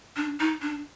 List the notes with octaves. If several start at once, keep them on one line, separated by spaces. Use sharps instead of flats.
D4
D#4
D4